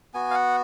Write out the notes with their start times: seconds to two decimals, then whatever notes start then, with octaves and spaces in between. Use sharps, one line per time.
0.14 B3 F#4 G#5
0.31 F5
0.35 F#5